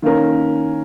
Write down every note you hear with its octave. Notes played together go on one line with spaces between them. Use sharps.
D#3 A#3 C#4 A#4